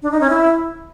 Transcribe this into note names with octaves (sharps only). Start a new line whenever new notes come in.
D4
D#4
C#4
E4